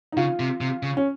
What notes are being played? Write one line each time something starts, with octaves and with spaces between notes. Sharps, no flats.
D#4
C#3 F4
C3
C3
C#3
C#4